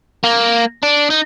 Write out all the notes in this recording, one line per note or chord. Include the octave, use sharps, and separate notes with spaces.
A#3
D4
D#4